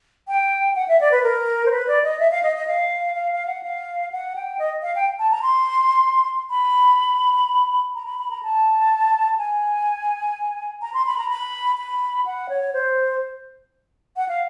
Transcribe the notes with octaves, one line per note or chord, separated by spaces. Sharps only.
G5
F#5
E5
D5
B4
A#4
C5
B4
D5
D#5
E5
F5
D#5
D#5
F5
F5
F5
F#5
F5
F#5
G5
D#5
F5
G5
A5
A#5
C6
B5
A#5
B5
B5
A#5
A5
G#5
A#5
C6
B5
A#5
B5
B5
F#5
C#5
C5
F#5
F5